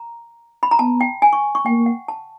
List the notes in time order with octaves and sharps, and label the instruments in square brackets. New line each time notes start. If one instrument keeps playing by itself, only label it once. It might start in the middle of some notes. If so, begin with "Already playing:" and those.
Already playing: [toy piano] A#5
B5
A#5
[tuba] B3 [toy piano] A5
[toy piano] G5
G#5
C#6
C#6
[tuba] A#3 [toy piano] G5
[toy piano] F#5
A5